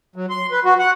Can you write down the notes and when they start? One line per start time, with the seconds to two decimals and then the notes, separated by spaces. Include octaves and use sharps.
0.16 F#3
0.30 C6
0.52 B4
0.65 F#4
0.79 F#5